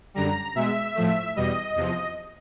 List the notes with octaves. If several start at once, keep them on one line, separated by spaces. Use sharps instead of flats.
F#2 D3 G3 A#5
B2 G#3 E5
A2 F3 A3
E2 B2 G3 D#5
E2 C3 F3